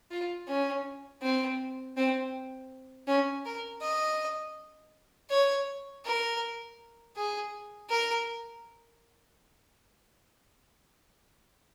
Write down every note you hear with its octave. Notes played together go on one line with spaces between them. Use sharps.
F4
C#4
C4
C4
C#4
A#4
D#5
C#5
A#4
G#4
A#4